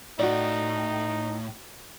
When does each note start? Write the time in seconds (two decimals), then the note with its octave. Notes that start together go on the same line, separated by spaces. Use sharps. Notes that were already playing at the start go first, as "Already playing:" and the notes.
0.19 A2 D#4 F#4 D5